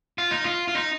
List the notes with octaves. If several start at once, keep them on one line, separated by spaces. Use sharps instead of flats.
F4
D#4
F4
F4
D#4